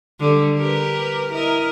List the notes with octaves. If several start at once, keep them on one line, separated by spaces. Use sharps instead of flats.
D3 G3
G4 A#4 B4
E4 A#4 D#5